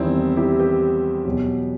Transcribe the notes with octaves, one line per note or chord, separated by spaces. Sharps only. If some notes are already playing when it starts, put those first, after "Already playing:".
Already playing: E2 D#3 G3 C4 E4
E4 G4
G4 B4
E2 B2 F#3